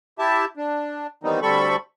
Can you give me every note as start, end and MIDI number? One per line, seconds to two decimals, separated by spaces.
0.19 0.45 64
0.19 0.45 67
0.19 0.45 76
0.19 0.45 81
0.57 1.07 62
1.23 1.40 51
1.23 1.40 52
1.23 1.40 55
1.23 1.40 59
1.23 1.40 60
1.23 1.40 63
1.42 1.76 38
1.42 1.76 55
1.42 1.76 60
1.42 1.76 69
1.42 1.76 83
1.42 1.76 85